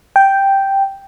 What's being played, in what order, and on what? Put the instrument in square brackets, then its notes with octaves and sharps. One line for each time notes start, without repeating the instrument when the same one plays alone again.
[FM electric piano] G5